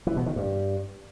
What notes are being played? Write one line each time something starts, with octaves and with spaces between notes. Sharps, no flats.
E3
B2
D#3
G2